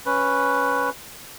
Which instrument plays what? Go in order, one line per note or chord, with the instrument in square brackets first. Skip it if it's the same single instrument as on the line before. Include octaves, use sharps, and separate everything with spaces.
[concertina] C#4 B4